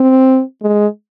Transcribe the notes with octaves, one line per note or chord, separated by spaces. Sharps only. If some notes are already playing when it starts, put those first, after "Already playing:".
Already playing: C4
G#3